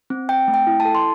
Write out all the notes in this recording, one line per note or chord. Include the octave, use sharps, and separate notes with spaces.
C4
C4 G5
A3
G5
E4
A5
A4
C6